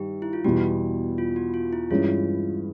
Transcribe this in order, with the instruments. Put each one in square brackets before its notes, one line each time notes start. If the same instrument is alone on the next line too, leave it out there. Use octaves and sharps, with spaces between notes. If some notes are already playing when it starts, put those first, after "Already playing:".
Already playing: [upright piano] G2 D#3 [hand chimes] G4
[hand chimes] E4
F4
[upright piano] E2 B2 G3 [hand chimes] F#4
[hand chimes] F4
F#4
F4
E4
[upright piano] G2 E3 G#3 C#4 [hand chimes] F4